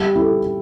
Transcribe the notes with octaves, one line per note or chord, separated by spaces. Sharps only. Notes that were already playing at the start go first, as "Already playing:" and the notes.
Already playing: G3
E4 A4